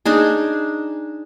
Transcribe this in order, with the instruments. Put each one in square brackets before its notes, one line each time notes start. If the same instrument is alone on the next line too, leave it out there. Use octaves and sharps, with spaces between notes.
[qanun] D4 D#4 G#4